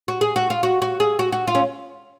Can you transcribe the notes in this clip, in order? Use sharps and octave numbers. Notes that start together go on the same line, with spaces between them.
F#4
G#4
F#4
F4
F#4
F#4
G#4
F#4
F#4
F4
C#4